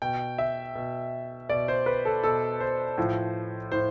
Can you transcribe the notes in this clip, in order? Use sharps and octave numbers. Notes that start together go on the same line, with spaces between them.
B2 G5
E5
B2
B2 D5
C5
B4
A4
B2 A4
C5
A2 F3
A2 C5